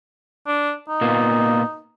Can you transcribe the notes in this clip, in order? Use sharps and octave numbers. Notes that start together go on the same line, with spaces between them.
D4
D#4
A#2 A#3 B3